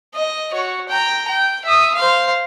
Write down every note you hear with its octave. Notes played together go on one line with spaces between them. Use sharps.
D#5
F#4 C#5
G5 A#5
G5
E5 D#6
C5 F5